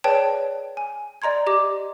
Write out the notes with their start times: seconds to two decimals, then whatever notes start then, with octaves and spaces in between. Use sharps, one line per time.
0.04 G#4 B4 C#5 D5 G5 A5
0.77 G#5
1.22 D5 D#5 A#5 C6 G#6
1.47 G4 D#5 D6